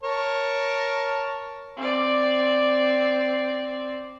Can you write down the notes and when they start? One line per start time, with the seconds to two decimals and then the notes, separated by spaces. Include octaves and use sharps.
0.03 A#4 C#5 A5
1.77 C4 D5